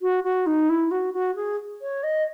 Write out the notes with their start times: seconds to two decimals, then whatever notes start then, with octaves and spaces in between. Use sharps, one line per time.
0.02 F#4
0.24 F#4
0.46 D#4
0.69 E4
0.91 F#4
1.13 F#4
1.36 G#4
1.82 C#5
2.03 D#5